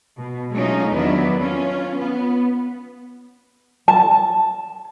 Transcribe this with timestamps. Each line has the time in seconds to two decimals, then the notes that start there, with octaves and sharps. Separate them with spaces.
0.18 B2
0.53 F#3 G#3 A3 C#4 D#4 F4
0.93 E2 D#3 F#3 B3 D4 E4
1.41 C#4 F4
1.99 B3
3.88 A5